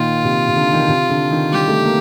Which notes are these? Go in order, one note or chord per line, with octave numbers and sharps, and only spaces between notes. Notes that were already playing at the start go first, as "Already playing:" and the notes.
Already playing: A#2 D#3 F4
C3
C3
D3
D#3
D3
C3
D3
D#3
G3 G4
A3
A#3